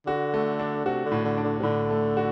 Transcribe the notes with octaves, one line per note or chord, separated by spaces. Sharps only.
D3 F#4
A3
D4
C3 F#4
D3
A2
D3
D4
D3
C3
A2 D3
A3
F#4